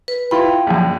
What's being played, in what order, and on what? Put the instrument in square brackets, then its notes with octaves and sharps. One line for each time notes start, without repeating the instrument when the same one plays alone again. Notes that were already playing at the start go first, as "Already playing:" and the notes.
[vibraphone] B4
[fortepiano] E4 F4 B5 [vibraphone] G5
[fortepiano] A#1 F#2